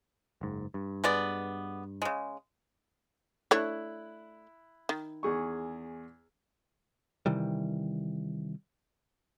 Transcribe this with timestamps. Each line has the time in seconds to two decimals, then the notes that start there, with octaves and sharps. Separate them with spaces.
0.41 F#1 G#2
0.74 G2
1.04 G#3 B3 D5
2.02 C#3 G#3
3.51 A3 D4 E4 C#5 F#6
4.89 D#3
5.23 E2 G#4 C#6
7.26 C3 D#3 E3 G3